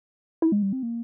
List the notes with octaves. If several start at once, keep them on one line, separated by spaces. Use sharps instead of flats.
E4
G#3
G3
C4
A#3